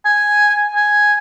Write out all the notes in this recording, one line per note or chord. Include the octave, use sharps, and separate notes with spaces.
G#5
G#5